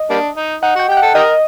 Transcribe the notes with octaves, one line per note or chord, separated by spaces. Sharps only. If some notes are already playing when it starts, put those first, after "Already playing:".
Already playing: D#5
G3 A#3 D4
D#4
D#4 F#5
F#4 G5
G4 G5
F#5
A4
D#4 G4 A#4 D#5